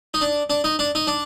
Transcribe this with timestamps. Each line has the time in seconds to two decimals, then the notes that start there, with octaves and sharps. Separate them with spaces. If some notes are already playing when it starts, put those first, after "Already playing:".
0.14 D#4
0.21 D4
0.50 D4
0.64 D#4
0.79 D4
0.95 D#4
1.07 D4